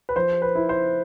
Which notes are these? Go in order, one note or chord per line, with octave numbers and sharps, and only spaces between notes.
B4
F3 C5
B4
E4
C5